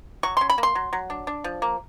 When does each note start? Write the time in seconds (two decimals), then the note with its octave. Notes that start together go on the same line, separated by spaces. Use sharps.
0.23 F#3 C#6
0.37 C#4 C6
0.50 B5
0.58 A#3
0.63 C6
0.75 F#3
0.93 F#3
1.10 D4
1.27 D4
1.44 F3
1.62 A#3